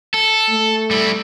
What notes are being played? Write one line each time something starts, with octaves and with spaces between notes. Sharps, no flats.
A4
A3
G3 E4